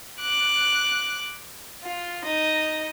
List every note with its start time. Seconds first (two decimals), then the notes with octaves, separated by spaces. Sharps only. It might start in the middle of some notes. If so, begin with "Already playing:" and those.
0.21 D6 F#6
1.83 F4
2.24 D#4 D#5